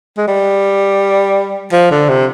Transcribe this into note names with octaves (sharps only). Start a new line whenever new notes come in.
G#3
G3
F3
D3
C3